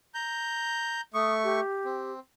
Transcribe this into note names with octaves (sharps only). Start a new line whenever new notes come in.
A#5 G6
A3 C#6 D#6
G4
C4